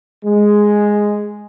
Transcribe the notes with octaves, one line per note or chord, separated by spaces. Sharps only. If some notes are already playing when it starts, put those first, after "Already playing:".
G#3